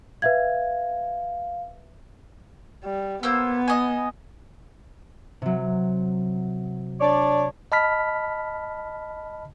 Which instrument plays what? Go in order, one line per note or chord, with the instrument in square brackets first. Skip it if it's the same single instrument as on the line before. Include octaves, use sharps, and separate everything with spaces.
[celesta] B4 E5 G#6 [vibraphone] F5
[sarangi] G3
[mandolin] A#3 C5 E6 [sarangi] B3
[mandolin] D#5 G#5
[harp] C3 F#3
[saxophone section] D4 C#5 D5
[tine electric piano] D#5 A5 B5 F6 B6